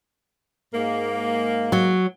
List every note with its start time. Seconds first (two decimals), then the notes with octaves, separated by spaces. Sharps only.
0.74 G#2 G#3 A#3
1.72 F#3